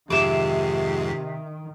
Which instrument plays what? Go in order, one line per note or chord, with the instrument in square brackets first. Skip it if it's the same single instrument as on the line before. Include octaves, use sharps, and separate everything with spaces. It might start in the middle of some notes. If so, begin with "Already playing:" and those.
[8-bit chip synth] F2 G#2 [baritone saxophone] C3 [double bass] D#3 [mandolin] E5 D6